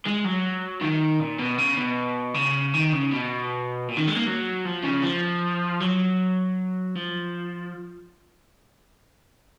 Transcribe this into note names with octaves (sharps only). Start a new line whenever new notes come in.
G#3
F#3
D#3
A#2
B2
C#3
B2
C#3
D#3
C#3
B2
A#2
D#3
G#3
A#3
F#3
F3
C#3
F3
F#3
F3